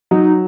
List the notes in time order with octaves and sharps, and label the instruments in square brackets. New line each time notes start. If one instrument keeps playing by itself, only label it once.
[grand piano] F#3 [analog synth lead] D#4